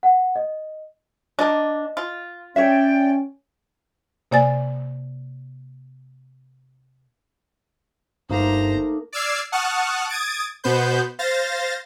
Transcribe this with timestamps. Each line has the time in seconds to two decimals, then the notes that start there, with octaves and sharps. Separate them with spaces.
0.03 F#5
0.36 D#5
1.39 A#3 D4 D#5
1.97 F4
2.56 C#4 C#5 D5 E5 G5
4.31 C3 A#3 D5 G#5 A6
8.30 G1 A3 A#3 D#4 C5 A#5
9.13 D5 D6 E6 F6 G#6 C7
9.52 F#5 A5 C#6 D#6 F6 F#6
10.09 D#6 G#6 A6 D7
10.64 B2 B3 B4 C5 G6
11.19 C5 F5 A6 A#6